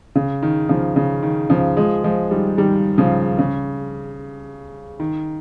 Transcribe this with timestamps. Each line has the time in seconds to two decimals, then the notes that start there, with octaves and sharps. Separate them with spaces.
0.15 C#3
0.43 D#3
0.69 C#3 F3
0.96 C#3
1.23 D#3
1.50 C#3 F3
1.77 F3 G#3
2.04 F3 G#3
2.31 D#3 G3
2.57 D#3 G3
2.98 C#3 F3
3.39 C#3
5.00 D#3